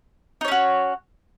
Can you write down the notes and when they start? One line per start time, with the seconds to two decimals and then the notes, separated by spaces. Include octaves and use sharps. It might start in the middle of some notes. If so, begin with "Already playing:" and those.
0.41 D#4
0.45 C#5
0.48 C#4
0.51 F#4